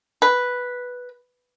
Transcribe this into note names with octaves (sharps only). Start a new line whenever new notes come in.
B4